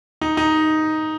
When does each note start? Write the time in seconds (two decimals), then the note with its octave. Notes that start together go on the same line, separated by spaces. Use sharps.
0.22 D#4
0.37 D#4